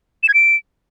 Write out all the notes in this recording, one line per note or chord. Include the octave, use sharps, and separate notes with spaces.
E7
G#6
D7